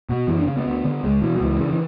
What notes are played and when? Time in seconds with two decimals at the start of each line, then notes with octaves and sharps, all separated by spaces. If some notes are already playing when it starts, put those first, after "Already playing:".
0.09 B2
0.27 F#2 E3
0.37 D4
0.46 C#3 C#4
0.57 B3
0.66 D2
0.84 D3
1.03 C#2 G#3
1.21 B2 E3
1.35 F#3
1.40 C#2 E3
1.59 C#3
1.71 E3